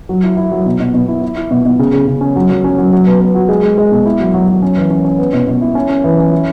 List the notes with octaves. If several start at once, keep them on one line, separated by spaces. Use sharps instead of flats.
F#3
E4
E4
F#3
B2
B2
B2
E4
E4
E4
B2
B2
C#3
C#3
C#3
C#4
F#3
F#3
C#4
F#3
F#3
B3
B3
F#4
G#3
G#3
G#3
B2
E4
F#3
F#3
F#3
C#4
E3
C#4
C#4
B3
B2
B2
E4
C#4
C#4
E3
C#4
E4